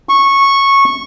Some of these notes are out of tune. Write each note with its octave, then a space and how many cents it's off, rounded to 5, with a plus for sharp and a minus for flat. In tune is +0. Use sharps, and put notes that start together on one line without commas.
C#6 -10